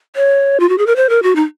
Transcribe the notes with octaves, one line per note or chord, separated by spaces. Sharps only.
C#5
F4
F#4
G#4
A#4
C5
A#4
F#4
D#4